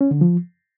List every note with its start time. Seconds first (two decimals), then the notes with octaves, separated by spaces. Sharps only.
0.01 C#4
0.11 D3
0.21 F3